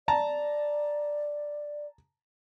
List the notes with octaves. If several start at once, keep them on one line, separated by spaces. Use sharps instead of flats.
D5 A5 A#5